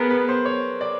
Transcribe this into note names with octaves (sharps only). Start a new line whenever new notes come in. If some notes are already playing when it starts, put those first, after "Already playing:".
Already playing: B3 G#4 A#4
B4
C5
C#5
D5